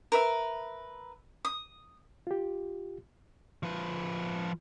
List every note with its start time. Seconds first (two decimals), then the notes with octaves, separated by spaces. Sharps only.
0.12 A#4 B4 E5
1.45 D#6
2.27 F4 G4
3.63 F3 B4